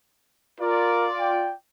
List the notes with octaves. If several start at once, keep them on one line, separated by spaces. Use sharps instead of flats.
F4 A#4 D5
G5